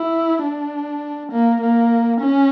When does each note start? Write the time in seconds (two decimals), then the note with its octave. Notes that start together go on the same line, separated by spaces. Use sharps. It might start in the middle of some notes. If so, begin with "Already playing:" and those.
Already playing: E4
0.44 D4
1.31 A#3
1.61 A#3
2.20 C#4